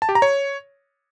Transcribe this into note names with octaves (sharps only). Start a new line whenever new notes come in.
A5
G4
A#5
C#5